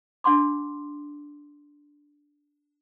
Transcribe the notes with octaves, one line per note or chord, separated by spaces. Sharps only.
D4 F#5 C6 D6